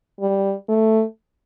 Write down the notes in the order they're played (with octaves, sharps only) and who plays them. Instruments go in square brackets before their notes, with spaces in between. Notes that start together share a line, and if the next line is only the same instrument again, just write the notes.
[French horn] G3
A3